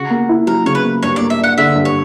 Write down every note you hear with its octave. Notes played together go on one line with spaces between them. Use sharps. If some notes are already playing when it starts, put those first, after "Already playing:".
Already playing: C#3 F#4
A#3
E4
F#3 A#4
C#3 C#5
B4
A#3
G2 C#5
A#3 D5
E5
D4 F#5
D3 E5
G2
C#5